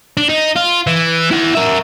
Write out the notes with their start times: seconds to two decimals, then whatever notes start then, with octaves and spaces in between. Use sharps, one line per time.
0.17 D4
0.29 D#4
0.56 F4
0.87 E3
1.31 E4 F#5
1.55 A#4 E5